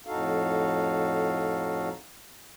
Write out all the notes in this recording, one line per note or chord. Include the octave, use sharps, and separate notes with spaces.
F2 A2 D#4 F#4 A4 F5